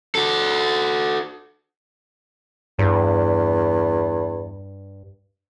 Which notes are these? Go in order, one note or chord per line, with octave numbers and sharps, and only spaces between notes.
F#4 A4
E2 G2